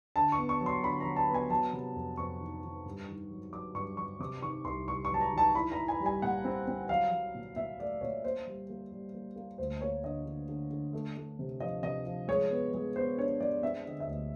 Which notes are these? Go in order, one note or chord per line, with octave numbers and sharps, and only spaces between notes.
D3 A5
C#6
B3
C#6
F#3
C6
D3 B5
A#5
F#3
A5
B3
G#5
F#3 A5
C3
F2
F2 C#6
D#3
D#3
G2
D#3
F#3
F#3 D6
G2 C#6
F#3 C#6
C3 D6
D#3 C#6
C2 C6
C2 C#6
C#6
F#3 A5
A#5
D#3 A5
E4 B5
E4 A#5
G#5
G3
G#5
A#2 F#5
C4
C4
F#3 F5
F#3
A#2
A#2 E5
A3 D5
A#2 C#5
A#3 C5
G3
A#3
G3
A#3
A#3
D2 C5
A#3 C#5
D3 D#5
D3
D3
D3
A3
A3
C3
F3 D#5
C3 D#5
F3
G#3 C#5
B3
G#3
B3 C5
D4 C#5
G#3 D5
C4 E5
D3 D#5
E5
D2 D#5